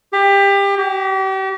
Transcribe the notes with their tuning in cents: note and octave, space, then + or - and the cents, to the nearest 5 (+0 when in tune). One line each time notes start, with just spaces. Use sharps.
G4 +25
G4 -40